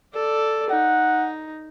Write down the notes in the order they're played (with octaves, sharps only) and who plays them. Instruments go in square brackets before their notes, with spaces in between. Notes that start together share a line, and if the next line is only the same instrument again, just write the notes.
[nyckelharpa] A4 D5
[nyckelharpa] D#4 [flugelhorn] F#5